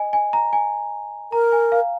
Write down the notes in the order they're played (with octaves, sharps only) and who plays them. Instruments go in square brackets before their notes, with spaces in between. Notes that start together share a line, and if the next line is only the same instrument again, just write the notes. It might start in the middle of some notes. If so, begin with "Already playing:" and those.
Already playing: [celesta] D#5 G#5
G#5
A#5
G#5
[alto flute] A#4 [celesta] A#5
[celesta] G#5
F5